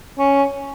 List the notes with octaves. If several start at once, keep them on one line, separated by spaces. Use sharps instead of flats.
C#4